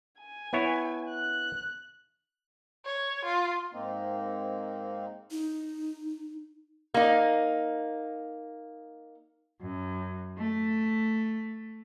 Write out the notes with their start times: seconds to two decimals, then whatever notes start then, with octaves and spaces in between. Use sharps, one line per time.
0.21 G#5
0.53 B3 E4 C#5
1.11 F#6
2.85 C#5
3.25 F4
3.73 G#2 A#3 C4 D#4
5.31 D#4
6.94 A#3 D#4
9.60 F#2
10.37 A3